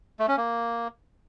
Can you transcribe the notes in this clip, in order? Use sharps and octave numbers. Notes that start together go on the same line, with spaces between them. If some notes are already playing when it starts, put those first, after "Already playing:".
A3
C#4
A#3